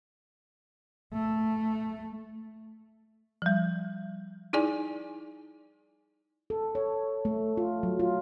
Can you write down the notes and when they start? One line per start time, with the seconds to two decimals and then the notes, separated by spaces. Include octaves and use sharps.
1.14 A3
3.42 F3 G3
4.53 D#4 E4 G#4 D5 G#5
6.50 A4
6.75 C#5
7.25 A3
7.57 F4
7.83 F#3
8.00 F4